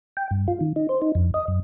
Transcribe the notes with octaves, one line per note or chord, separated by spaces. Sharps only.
G5
G2
F4
D#3
D#4
C5
D#4
F2
D#5
F#2